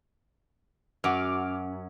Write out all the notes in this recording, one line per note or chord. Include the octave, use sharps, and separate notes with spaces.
F#2 F#4 D6 F6